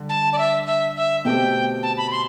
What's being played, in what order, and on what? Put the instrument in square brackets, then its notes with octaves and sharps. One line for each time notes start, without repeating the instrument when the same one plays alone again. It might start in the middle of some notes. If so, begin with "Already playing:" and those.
Already playing: [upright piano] D3 G3
[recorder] A5
D5
E5
E5
E5
[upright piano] B2 A3 C4 G4 [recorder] G5
[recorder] A5
B5
C6